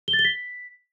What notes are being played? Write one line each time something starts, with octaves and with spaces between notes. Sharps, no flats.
G7
A6
G7
B6